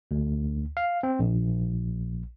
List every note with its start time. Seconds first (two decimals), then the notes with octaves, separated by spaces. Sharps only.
0.11 D2
0.77 F5
1.03 C4
1.19 A#1